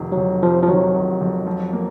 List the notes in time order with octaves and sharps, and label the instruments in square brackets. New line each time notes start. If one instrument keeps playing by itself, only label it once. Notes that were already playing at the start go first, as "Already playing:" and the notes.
Already playing: [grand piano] F1 C3 D#3
[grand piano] F2 [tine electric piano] F#3
[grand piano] C3 [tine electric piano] F3
[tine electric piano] F3
[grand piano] D#3 [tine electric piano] F#3
[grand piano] F1
F2
F3
A#3